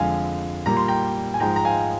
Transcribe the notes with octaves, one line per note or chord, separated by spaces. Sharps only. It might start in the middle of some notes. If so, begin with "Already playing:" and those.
Already playing: F2 D3 G#3 F5 G#5
A#2 G3 A#3 A#5
C6
G5 A#5
G#5
G#2 F3 G#3 G5 A#5
A#5
F5 G#5